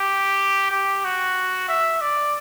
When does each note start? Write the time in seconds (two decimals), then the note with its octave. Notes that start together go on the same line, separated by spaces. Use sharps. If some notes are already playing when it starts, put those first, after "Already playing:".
Already playing: G4
0.71 G4
1.05 F#4
1.69 E5
2.01 D5